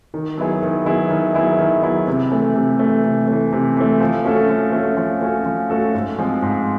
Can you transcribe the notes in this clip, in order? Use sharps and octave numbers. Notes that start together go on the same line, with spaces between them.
D#3
F#3 B3 E4 G#4
D#3
F#3 B3 E4 G#4
D#3
F#3 B3 E4 G#4
D#3
F#3 B3 E4 G#4
C3
E3 A3
C3
E3 A3
C3
E3 A3
C3
E3 A3
F3
A3 C#4 F#4 A4
F3
A3 C#4 F#4 A4
F3
A3 C#4 F#4 A4
F3
A3 C#4 F#4 A4
G#2
F3 G#3 C4 F4
G#2